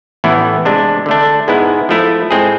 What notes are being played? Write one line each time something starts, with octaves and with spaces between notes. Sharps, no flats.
A1 A2 E3 B3 E4
C3 G#3 D4
D3 A3 D4
G#2 G#3 B3 E4
F3 A3 E4
A2 G#3 C4 G#4